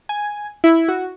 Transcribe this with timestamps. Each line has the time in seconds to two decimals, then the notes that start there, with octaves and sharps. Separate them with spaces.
0.09 G#5
0.64 E4
0.88 F#4